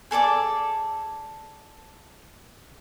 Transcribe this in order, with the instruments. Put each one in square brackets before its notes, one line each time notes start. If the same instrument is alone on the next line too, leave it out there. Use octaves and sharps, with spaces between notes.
[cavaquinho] G#4 A4 D5 D6